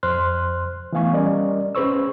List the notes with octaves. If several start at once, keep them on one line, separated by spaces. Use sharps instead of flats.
F2 C5 C6 F6 F#6
E3 A3 B3 F5 G#5 C#6
G3 C#4 A#4 D5 D#5
C#4 G#4 B4 C5 C#6 E6